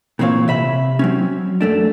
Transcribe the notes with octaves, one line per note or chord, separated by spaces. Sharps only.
A#2 E3 C4 C#5 F5
C3 E5 B5
F#3 C4 C#4
F#2 A3 D4